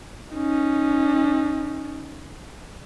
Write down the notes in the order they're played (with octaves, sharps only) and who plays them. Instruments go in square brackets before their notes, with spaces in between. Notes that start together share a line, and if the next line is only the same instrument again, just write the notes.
[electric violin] C#4 D#4